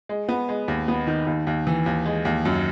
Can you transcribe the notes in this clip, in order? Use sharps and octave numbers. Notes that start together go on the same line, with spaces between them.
G#3
B3
G#3
D#2
B3
D#3
D#2
D#2
E3
D#2
G#3
D#2
F#2